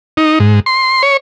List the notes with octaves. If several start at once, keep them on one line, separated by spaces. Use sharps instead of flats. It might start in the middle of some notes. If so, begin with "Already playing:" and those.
D#4
G#2
C6
C#5